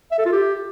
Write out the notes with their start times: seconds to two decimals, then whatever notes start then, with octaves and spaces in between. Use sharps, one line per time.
0.12 E5
0.19 A4
0.26 F4
0.33 G4